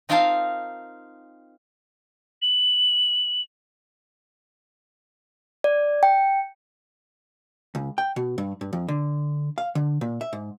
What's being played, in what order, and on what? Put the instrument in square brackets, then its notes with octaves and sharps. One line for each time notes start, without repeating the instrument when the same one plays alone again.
[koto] C4 D#4 F4 A#4 F5 A5
[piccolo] F#7
[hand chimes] D5
G5
[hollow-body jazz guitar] C#2
G5
B2
G2
G2
F2
D3
F5
D3
A#2
E5
G#2